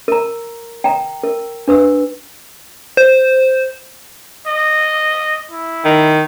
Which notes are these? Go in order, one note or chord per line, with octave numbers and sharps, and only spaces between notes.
A#4 A#5
G5 A#5
A#4
D4 B4 E6
C5
D#5
E4
D#3